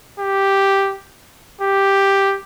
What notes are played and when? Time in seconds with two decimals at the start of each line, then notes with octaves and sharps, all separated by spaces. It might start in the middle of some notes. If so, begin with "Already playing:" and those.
0.19 G4
1.61 G4